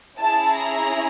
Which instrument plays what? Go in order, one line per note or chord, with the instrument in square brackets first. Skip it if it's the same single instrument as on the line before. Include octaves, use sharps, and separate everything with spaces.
[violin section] C#4 E4 G#4 A5
A#5